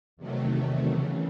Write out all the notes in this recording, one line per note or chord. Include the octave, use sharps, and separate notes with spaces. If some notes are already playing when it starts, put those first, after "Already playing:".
E2 C3 D#3 F#3 A3
E2 C#3 E3